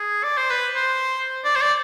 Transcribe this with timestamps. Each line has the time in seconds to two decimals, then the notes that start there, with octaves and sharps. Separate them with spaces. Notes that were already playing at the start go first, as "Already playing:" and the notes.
Already playing: G#4
0.24 D5
0.37 C5
0.50 B4
0.75 C5
1.44 D5
1.56 C5
1.61 D5